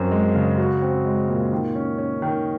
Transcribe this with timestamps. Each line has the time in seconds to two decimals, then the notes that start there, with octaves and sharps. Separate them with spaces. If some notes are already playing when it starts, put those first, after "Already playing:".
Already playing: F#2 C4
0.11 G#3
0.35 C#3
0.58 F#4
0.82 C4
1.05 G#3
1.28 A#2
1.52 D#3
1.75 C#4
1.98 C#4
2.22 D#3